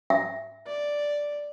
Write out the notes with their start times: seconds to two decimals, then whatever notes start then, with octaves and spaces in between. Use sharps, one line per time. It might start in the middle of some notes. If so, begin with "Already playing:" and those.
0.10 E5
0.66 D5